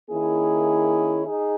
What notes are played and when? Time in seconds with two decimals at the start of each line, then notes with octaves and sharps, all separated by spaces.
0.11 D#3 A#3 C#4 E4 G#4
1.26 D#4 G#4